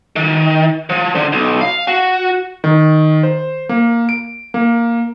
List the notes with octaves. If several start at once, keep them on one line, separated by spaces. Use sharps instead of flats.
D#3
F3
D3
B1
F5
F#4
D#3
C5
A#3
D7
A#3